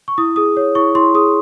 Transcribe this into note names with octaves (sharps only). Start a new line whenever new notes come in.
C#6
E4 D#6
G#4 D#6
C#5
E4 C#6
E4 C6
G#4 D#6